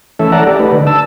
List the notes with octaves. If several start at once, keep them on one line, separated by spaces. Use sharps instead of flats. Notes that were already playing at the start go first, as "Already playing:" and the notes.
E3 A3 C#4 A4 E5
D5 F#5 A5 A#5
G4 A4 D5
A3 D#4 B4
D3
A5 E6